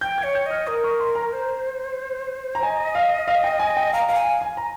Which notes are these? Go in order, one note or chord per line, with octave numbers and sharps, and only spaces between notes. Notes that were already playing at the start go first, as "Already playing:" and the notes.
G5 G6
G#6
C#5
G6
D#5 F6
A#4 D#6
C#6
C6
A#5
C5
A#5
D#5 G#5
F5
F5
G5
G#5
G5
F5 A#5
F5 A#5
G#5
F5
G#5
A#5